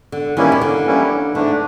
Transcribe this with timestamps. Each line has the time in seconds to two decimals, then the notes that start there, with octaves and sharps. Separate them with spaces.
0.12 D3
0.37 D#3 E3 G3 A#3 C#4 E4
0.52 D#3
0.61 D3
0.85 E3 G3 A#3 C#4 E4
1.34 G#2 D3 E3 A3 D4